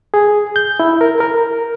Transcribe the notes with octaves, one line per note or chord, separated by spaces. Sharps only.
G#4
G6
E4
A#4
A#4